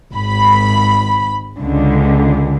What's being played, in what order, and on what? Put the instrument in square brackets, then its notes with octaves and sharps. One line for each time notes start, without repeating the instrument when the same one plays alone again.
[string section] G#1 B5
C#2 D3